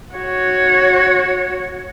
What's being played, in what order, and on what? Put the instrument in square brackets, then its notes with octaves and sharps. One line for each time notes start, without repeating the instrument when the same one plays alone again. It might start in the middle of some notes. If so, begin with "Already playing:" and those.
[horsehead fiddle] F#4 C#5